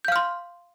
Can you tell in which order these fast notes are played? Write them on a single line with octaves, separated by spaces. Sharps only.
G6 F5 F6 C6